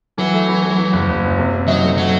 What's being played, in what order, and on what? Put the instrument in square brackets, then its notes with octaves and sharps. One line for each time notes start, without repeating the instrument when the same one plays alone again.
[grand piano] E3 [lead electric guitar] F#3
[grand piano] A3
E3
E3
E3
F#1
F#1
F#2
C3
C3
[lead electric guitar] F#3 [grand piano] D#4
[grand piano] A3
[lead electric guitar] F#3 [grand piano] A3